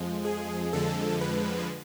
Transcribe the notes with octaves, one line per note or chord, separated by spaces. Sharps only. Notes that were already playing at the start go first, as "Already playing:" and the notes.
Already playing: F2 F3 G#3
G#4
F2 D3 F3 G#3 A4
B4